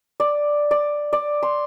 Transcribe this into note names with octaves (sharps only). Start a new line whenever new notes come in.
D5
D5
D5
C6